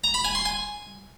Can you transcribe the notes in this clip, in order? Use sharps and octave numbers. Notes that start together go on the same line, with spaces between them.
A#5
B5
G#5
C6
G#5